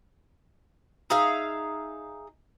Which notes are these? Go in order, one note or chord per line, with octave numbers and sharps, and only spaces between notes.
D#4 G#4 E5 F5